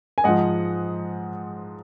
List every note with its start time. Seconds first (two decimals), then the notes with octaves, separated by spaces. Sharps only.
0.18 G#5
0.24 G#2 F3 D#5 F#5